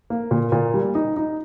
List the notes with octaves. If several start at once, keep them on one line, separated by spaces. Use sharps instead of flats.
A#3
A#2
A#2
G3
D#4
D#4